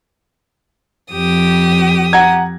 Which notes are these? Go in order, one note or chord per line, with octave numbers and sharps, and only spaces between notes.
F2 G4 D#6
F#5 A#5 G#6